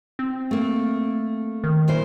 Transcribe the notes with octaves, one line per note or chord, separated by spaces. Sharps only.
C4
A3 A#3
D#3
A#2 E4 C5